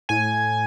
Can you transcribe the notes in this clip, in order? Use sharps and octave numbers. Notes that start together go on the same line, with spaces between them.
A2 G#5